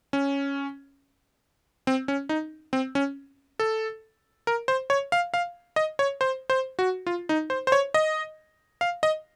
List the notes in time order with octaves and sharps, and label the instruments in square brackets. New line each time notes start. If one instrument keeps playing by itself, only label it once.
[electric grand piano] C#4
C4
C#4
D#4
C4
C#4
A4
A#4
C5
C#5
F5
F5
D#5
C#5
C5
C5
F#4
F4
D#4
C5
C5
C#5
D#5
F5
D#5